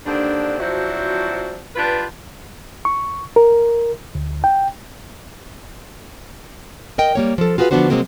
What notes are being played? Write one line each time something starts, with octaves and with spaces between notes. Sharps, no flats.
D#2 D3 C4 D4
F3 F#3 C4 D4 E4 F#4
D4 F4 G4 B4
C#6
A#4
D2
G5
A#4 D#5 G5
G3 A#3 C#5
F3 A4
F4 F#4 G#4 A#4 B4 F5
D3 F3 B3 D4 F#4 C5
C3 E3 F#3 G#3 A#3 C4